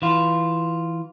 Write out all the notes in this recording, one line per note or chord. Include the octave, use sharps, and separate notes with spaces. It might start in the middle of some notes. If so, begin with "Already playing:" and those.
E3 F4